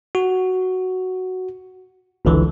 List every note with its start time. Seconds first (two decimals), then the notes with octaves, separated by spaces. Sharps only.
0.15 F#4
2.25 G1 C#2 D3 E3